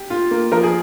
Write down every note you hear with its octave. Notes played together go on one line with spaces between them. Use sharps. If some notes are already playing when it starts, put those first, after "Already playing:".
Already playing: G4
F4
A#3
F3 A#4
G#4